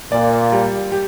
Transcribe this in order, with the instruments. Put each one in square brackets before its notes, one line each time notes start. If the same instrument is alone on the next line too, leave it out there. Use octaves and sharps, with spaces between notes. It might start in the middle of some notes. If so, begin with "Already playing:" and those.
[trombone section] A#2 [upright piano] D5
[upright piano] G3
G4